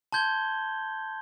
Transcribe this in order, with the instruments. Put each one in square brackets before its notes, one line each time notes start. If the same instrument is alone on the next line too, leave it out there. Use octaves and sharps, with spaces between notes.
[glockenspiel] A5 C6 G6 G#6 G7